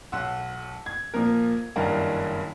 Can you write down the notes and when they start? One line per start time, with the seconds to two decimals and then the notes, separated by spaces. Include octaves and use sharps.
0.12 B1 F#5 C6 E6
0.86 G#6
1.14 A#2 F3 A#3 A#4
1.76 F#1 G2 D#3 E4 A#4 F5